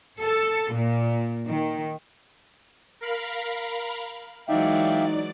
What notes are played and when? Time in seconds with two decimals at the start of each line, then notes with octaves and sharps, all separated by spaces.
0.20 A4
0.73 A#2
1.48 D#3
3.01 A#4 F5 B5
4.48 E3 F#3 G#3 D#4 D5 E5 F5 G5